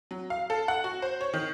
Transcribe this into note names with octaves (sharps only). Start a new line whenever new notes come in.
F#3
F5
A4
F#5
F#4
C5
C#5
D#3